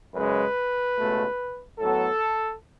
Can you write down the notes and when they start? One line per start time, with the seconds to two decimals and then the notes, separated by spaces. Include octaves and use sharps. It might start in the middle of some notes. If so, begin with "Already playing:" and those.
0.14 F#2 C#3 G#3 B4
0.97 C#2 B2 A3
1.80 A2 F#3 B3 A4